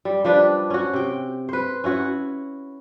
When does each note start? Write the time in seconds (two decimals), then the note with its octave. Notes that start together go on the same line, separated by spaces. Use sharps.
0.05 G3
0.24 F3 G3 D4 B4
0.70 C#4 F#4
0.93 C3 G5
1.49 B4 C5
1.84 C#4 E4 F#4 C#5